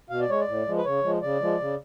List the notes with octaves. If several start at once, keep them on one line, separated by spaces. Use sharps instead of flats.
B2 F5
D5
G#3 C#5
D5
A2
F3 G#3
B4
C#3 C#5
F3 G#3
C#3 D5
F3 G#3
C#3